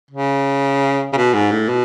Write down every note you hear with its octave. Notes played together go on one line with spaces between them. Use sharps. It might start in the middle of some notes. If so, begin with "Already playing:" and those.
C#3
C#3
B2
G#2
A2
B2